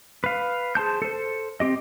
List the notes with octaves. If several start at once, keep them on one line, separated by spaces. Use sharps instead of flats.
B4 F5
G#4 C5 A5 G6
A4 C5
C4 G4 D#5